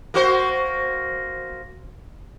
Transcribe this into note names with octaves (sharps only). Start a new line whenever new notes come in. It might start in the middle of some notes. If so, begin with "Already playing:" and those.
A#3 F#4 C5